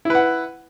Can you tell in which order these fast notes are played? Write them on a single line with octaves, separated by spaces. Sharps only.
E4 B4 F#5